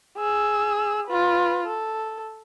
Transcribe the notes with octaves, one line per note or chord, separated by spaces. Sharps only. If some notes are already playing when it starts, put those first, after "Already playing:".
G#4 E6
F4 B4
A4